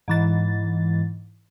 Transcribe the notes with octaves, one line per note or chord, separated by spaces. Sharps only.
G#2 E3 A6